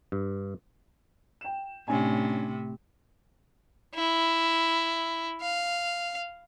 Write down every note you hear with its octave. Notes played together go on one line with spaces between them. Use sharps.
G2
G5 E7
A2 C3 C#4 D4 G#5
E4
F5